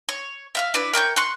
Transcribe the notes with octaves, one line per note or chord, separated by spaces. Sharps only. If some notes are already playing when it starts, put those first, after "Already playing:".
C#5
E5 F5 F6
D4 E4 B4
A#4 C#5 G5 G6
C6 C#6 F#6